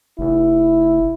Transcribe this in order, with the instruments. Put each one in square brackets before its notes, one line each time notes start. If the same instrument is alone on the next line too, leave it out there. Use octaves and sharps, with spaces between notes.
[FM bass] F1 [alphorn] E4